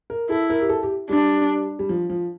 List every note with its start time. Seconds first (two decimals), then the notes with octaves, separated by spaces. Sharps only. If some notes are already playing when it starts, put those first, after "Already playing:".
0.10 A#4
0.30 E4 A4
0.50 A#4
0.61 G4
0.69 A4
0.83 G4
1.09 G3 D4
1.79 G3
1.89 F3
2.10 F3